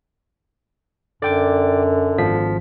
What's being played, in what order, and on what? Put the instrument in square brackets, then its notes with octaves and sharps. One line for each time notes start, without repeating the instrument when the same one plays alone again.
[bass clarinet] F#2 [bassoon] D3 [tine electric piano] D5 G5 D6
[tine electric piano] G#1 F3 B6